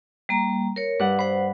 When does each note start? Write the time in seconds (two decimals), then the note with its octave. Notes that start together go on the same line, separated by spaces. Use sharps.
0.29 G3 A#3 A#5
0.76 A#4 C#5
1.00 G2 B4 F#5
1.19 C5 F#5 B5